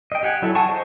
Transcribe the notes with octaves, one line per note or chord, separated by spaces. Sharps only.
D#5 G5
G4 F#5 G#5
F#3 E4 A4
E4 F#5 G#5 A5 C#6
G#4 C5 D#5